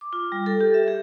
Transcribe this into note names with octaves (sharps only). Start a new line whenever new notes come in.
D6
F4
G3
A4
G4
E5
G#4